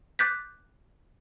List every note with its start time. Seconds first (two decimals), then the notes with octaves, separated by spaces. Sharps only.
0.19 D6 F#6 G6 A6 B6